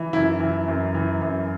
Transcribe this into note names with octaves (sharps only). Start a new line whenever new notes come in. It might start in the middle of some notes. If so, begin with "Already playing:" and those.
Already playing: E3
F#2 E4
E3
F#2
E3
F#2